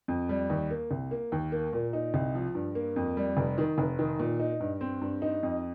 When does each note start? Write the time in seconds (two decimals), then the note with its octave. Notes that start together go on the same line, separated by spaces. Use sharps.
0.08 F2
0.29 G3
0.50 D#2
0.70 A#3
0.91 C2
1.11 A#3
1.32 D#2
1.52 A#3
1.73 A#2
1.93 D#4
2.14 C2
2.35 F3
2.55 G2
2.75 A#3
2.96 F2
3.17 G3
3.37 F1
3.58 D#3
3.78 F1
3.99 D#3
4.20 A#2
4.40 D#4
4.60 G2
4.81 C4
5.02 G2
5.22 D#4
5.43 F2